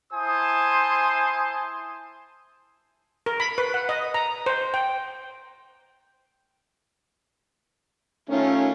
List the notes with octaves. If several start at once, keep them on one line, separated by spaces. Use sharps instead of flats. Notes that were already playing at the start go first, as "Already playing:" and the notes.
E4 C5 G#5 A5 C6 D#6
A#4
B5
B4
F#5
D#5
A#5
C5
G5
D#3 A3 C#4 F4